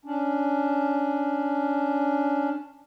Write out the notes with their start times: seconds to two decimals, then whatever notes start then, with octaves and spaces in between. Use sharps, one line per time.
0.05 C#4 D4